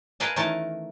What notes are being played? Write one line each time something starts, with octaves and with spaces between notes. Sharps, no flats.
G#4 A#4 B4 D#5 F5 A5
D#3 E3 A3 C#4 A#4 A5